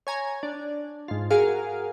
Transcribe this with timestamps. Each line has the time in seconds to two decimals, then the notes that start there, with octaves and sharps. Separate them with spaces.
0.07 C#5 G#5 A#5
0.43 D4
1.08 G#2 F4
1.30 F#4 G#4 A#4 F5